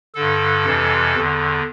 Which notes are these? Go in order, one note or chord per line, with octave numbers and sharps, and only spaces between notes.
G2 D3 A4
F2 C3 E3
E2 D3